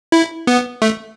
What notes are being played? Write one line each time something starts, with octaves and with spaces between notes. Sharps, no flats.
E4
B3
A3